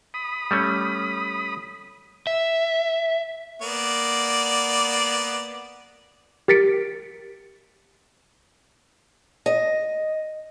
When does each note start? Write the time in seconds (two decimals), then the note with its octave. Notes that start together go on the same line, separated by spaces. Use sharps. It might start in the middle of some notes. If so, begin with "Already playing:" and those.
0.14 B5 D#6
0.51 G3 A3 C#4
2.27 E5
3.62 A#3 B3 D5
6.48 G4 A#4 A6 B6 C#7 D7
9.46 D#5